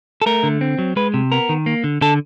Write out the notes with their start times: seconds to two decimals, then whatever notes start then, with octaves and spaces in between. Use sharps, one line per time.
0.22 A4
0.26 A3 A#4
0.43 D3
0.61 C4
0.78 F#3
0.96 G#3 B4
1.14 C3
1.32 B3 A#4
1.49 D#3
1.66 A#3
1.84 D3
2.01 D3 A4